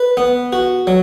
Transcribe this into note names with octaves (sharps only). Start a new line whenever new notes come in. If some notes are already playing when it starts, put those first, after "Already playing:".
Already playing: B4
B3
F#4
F#3